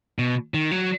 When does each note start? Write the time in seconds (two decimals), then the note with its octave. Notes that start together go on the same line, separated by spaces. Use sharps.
0.19 B2
0.54 D#3
0.71 F#3